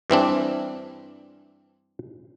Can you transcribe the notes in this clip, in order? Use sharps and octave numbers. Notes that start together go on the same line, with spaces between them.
G2 E3 C4 D4